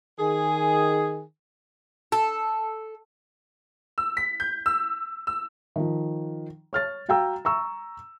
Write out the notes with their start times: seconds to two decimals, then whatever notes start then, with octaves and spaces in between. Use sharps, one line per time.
0.19 D#3 G#4
2.12 A4
3.98 E6
4.17 B6
4.40 G6
4.66 E6
5.27 E6
5.76 D#3 F3
6.73 C#5 F6 A6
7.09 F#4 F5 G5 A#5 E6
7.45 A#5 C#6 E6